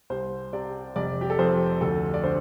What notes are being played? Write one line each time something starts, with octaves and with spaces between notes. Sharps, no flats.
C2 C5
C3 D5
F1 D5
G4
A4
F2 C5
D2 A4
D5
D3 C5